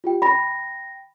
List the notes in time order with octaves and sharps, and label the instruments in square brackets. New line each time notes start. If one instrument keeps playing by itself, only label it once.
[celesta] F4 G4 G5
[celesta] G5 A#6 [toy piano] B5